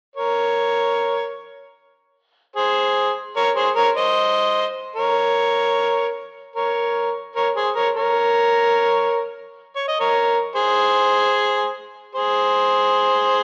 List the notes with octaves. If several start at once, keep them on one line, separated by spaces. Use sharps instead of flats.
A#4 C#5
G#4 C5
A#4 C#5
G#4 C5
A#4 C#5
C5 D#5
A#4 C#5
A#4 C#5
A#4 C#5
G#4 C5
A#4 C#5
A#4 C#5
C#5
D#5
A#4 C#5
G#4 C5
G#4 C5